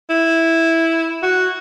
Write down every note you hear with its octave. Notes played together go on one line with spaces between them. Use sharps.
E4
F#4